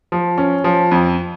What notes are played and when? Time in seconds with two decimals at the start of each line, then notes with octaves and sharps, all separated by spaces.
0.12 F3
0.38 C#4
0.64 F3
0.91 F2